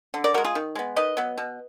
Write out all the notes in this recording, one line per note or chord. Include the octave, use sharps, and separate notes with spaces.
D3
A#4 D5
F3 G#3 F#4 A#4
F4 G#4
D#3
G#3 B3
D#3 B4 D#5
F#3 B3
B2